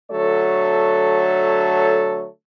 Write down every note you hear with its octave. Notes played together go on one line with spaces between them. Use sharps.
D3 F#3 A3 A4 C#5